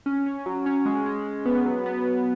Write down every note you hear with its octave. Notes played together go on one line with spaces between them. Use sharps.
C#4
C#4
F#3
C#4
G#3
G#3
G#3
B3
F#3
B3